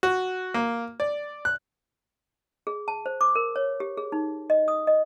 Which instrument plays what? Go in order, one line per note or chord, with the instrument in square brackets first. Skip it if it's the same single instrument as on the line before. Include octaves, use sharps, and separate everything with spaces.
[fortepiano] F#4
A#3
D5
F#6
[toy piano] G#4
A5
C5
D6
A#4
C#5
G4
G#4
D#4
D#5
D#6
D#5